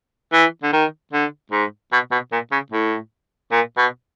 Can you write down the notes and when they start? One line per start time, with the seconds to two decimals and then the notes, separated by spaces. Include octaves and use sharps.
0.33 E3
0.63 D3
0.73 D#3
1.13 D3
1.52 G#2
1.92 B2
2.12 B2
2.32 A#2
2.52 C#3
2.72 A2
3.52 A#2
3.78 B2